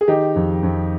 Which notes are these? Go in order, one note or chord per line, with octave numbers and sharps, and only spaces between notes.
G#4
D#3 D#4 G4
F2
F2